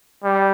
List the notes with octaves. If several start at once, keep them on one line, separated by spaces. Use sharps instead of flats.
G3